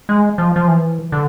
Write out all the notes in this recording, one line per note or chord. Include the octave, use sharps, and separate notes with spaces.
G#3
F3
F3
E3
D3